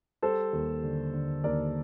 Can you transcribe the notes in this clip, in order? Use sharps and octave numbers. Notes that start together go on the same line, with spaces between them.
G3 A4 C5
D#2
D3
D3
D#2 A#4 D5